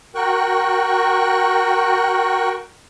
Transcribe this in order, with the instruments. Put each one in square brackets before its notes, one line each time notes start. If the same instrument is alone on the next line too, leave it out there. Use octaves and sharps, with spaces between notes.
[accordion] F#4 A#4 G5 C#6 F#6